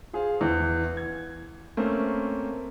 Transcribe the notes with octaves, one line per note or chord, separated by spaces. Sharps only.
F4 G#4 C5 F5
E2
G#6
A3 A#3 C4 C#4